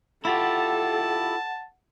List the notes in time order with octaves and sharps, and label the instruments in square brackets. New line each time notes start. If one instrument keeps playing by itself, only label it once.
[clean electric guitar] E4 F4 G4 [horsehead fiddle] A4 [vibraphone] F#5 [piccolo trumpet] A5